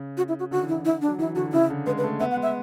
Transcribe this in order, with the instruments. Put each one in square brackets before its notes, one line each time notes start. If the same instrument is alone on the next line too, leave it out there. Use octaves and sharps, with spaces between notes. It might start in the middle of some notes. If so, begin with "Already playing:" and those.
Already playing: [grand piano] C#3
[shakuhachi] F#4
E4
F#4
[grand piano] D3 [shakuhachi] F#4
[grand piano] E3
[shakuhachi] E4
[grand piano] D3
[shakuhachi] E4
D4
[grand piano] F#3
[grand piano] E3 [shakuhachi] E4
[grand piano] D3 [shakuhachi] F#4
[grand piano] C#3 [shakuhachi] E4
[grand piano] D3
[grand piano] G#3 [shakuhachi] B4
[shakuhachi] B4
[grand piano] A3
[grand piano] B3 [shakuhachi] E5
[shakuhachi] F#5
[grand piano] G#3
[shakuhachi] E5